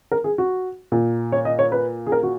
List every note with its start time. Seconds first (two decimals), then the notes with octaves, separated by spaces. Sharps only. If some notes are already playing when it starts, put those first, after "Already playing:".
0.11 A#4
0.24 G#4
0.38 F#4
0.92 A#2
1.32 C#5
1.45 D#5
1.59 C#5
1.72 B4
2.07 G#4
2.12 A#4
2.23 F#4